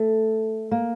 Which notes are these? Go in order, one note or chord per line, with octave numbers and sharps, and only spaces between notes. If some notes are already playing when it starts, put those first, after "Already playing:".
Already playing: A3
A#3